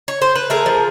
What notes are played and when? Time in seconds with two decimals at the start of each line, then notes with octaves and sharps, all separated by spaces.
0.08 C#5
0.22 C5
0.35 B4
0.50 A3 G#4 A#4
0.66 F3